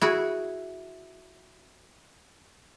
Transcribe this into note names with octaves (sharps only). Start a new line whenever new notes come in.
E4 F#4 G#4